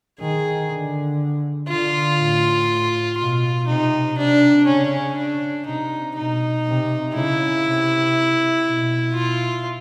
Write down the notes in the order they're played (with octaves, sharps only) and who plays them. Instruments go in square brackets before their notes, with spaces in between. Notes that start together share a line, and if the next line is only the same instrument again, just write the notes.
[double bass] D#3 [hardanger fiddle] G#4
[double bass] D3
[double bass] D3 [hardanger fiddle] F4
[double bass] A2
[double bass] B2 [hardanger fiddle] F4
[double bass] C3 [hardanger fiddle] D#4
[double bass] C3 [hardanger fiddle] D4
[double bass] C#3 [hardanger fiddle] C#4
[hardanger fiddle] D4
[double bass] C3 [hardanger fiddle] D#4
[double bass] B2 [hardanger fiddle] D#4
[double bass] C3
[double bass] C#3 [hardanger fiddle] E4
[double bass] C3
B2
[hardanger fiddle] F4